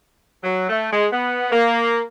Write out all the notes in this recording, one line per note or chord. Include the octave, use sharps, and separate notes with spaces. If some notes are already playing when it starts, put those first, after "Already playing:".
F#3
A3
G#3
B3
A#3